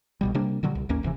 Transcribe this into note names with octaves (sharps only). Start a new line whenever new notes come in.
B1 B2 G3
C3 G3 A#3 D4
A#2 D3 F#3 G3
C2
A1 D#2 A#3 C#4
E1 D2 C3 E3